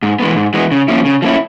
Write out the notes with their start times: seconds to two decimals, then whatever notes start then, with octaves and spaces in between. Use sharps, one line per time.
0.03 G#2
0.20 E3 G#3 B3
0.36 G#2
0.54 E3 G#3 B3
0.71 C#3
0.88 F3 A#3 C#4 E4
1.05 C#3
1.22 F3 A#3 C#4 E4